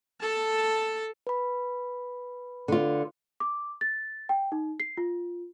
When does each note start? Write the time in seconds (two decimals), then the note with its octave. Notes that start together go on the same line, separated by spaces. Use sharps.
0.21 A4 A5
1.27 B4 B5
2.68 D3 F4
3.40 D6
3.81 A6
4.29 G5
4.52 D#4
4.80 C7
4.97 F4